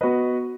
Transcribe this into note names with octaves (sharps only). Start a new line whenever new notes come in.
B3 F#4 B4 D#5